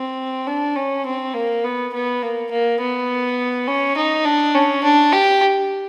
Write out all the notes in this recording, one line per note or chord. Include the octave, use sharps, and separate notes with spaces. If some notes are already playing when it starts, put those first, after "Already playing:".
Already playing: C4
D4
C#4
C4
A#3
B3
B3
A#3
A#3
B3
C#4
D#4
D4
C#4
D4
G4